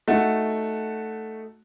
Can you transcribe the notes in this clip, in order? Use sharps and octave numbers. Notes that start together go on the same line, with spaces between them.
A3 D#4 F#4